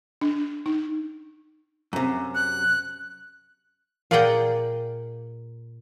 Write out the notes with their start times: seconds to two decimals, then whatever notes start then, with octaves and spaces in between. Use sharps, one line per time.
0.21 D4
0.66 D#4
1.93 F#2 C3
2.35 F#6
4.11 A#2 A#3 G#4 D5 F#5 G5